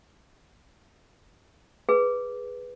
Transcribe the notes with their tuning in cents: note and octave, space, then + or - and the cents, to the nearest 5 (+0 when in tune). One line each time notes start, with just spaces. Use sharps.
G#4 -5 B4 -5